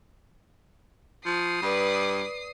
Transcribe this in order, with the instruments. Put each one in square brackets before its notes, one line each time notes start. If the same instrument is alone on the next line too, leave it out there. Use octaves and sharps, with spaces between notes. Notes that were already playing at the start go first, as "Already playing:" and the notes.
[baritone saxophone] F3 [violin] D#6 C7
[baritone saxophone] G2 [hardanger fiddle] B4 D5